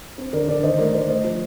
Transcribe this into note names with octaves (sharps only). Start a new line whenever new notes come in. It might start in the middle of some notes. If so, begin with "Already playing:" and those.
C4
D3 A#4 D5
D3 A#4 D5
D#3 C5 D#5
A3 A#4 D5
A3 C5 D#5
A3 C5 D#5
F3